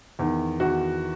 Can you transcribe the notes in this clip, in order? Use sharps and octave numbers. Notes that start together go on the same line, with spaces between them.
E2 D#3
E2 D#3 F#4